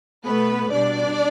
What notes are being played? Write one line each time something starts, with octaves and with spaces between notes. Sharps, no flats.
B2 A3 B3 B4
B2 G3 D4 D5